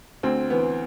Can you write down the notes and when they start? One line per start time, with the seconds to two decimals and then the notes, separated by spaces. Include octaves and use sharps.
0.23 D2 C4
0.50 E3 B3